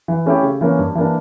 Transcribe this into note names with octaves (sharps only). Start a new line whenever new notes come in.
E3
A3 C#4 E4 G4
C#3
E3 A#3 C#4
G2
E3 A#3 D4